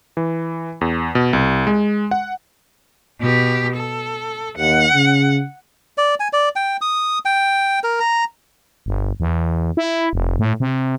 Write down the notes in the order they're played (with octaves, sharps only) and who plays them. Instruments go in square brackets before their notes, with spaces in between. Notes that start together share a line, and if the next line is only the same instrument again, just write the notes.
[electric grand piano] E3
E2
B2
C2
G#3
F#5
[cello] B2 G4
A4
[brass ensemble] D#2 [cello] F#5
[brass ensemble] C#3
[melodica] D5
G#5
D5
G5
D#6
G5
A#4
A#5
[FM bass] G1
E2
E4
F1
A2
C3